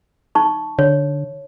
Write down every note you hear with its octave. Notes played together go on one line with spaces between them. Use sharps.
D#4 A5 C#6
D3 C#5